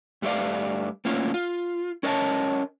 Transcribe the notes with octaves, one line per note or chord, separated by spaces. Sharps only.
G2 G3 A3 D#4 D5 F5
A2 A#3 C#4 F4
F4
C#4 A#4 C#5 D#5 G#5 A5